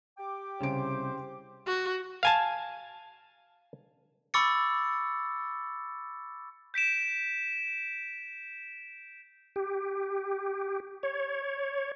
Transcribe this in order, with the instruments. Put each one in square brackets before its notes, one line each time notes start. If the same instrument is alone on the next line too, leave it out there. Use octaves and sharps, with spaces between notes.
[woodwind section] G4 G5 D6
[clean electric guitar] C2 [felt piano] C#3 D7 [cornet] C5
[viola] F#4
[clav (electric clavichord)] F5 G#5 A5
[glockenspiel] B5 C#6 D6 E6 A6 C#7
[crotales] G6 B6 D7 E7
[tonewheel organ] G4
C#5